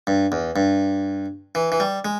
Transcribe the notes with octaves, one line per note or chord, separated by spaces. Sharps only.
G2
E2
G2
E3
E3
G3
G#3